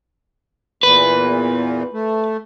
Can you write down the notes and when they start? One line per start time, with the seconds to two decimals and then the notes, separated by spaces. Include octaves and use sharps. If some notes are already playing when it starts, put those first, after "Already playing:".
0.83 E2 A#2 E3 B4
1.93 A3